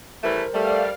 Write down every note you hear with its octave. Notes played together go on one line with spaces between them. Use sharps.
E3 G3 A3 A#4 C5
G3 A3 D5 F5 F6